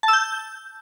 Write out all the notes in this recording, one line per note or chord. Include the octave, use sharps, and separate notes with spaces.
A5
E6
G6